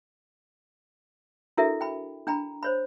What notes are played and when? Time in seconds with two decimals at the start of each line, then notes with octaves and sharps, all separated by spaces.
1.57 D4 E4 F#4 A4 A#4 E5
1.81 G5 B5
2.27 D4 G5 A#5 B5
2.63 C5 C#5 B5